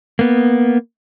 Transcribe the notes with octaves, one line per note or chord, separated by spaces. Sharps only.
A#3 B3